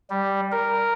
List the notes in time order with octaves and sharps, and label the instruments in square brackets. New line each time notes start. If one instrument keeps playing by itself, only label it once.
[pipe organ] G3
A#4